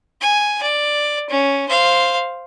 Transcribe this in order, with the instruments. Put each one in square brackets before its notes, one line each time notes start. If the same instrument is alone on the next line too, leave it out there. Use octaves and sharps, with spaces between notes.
[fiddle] G#5
D5
C#4
C5 F5